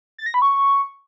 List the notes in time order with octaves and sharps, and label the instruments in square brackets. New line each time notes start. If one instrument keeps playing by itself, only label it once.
[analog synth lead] A6
A#6
B5
C#6